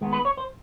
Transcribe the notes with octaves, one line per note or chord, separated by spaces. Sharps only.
D#2 D#3 G#3 B3
B4
C#5
C5